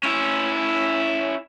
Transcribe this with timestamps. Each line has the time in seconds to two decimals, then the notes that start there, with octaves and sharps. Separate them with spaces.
0.03 C#4 E4